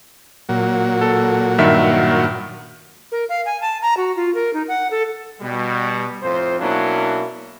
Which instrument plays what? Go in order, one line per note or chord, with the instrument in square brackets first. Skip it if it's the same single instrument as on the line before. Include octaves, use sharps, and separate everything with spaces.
[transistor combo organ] A#2 F#3
[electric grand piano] A4
G2 D#3 E5
[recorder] A#4
F5
G#5
A5
A#5
F#4
F4
A#4
D#4
F#5
A4
[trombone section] B2 G3
F2 A2 F4 C5
B2 F#3 A#3 C#4 D4 E4